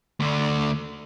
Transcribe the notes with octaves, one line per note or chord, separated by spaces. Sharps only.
D2 D3